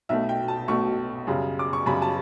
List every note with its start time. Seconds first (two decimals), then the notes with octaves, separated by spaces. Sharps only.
0.09 B1 B2 A3 E5
0.29 G5
0.48 A5
0.68 B1 B2 A3 C#6
1.27 F#2 C#3 G3
1.59 D6
1.73 C#6
1.86 F#2 C#3 G3 B5
2.02 A5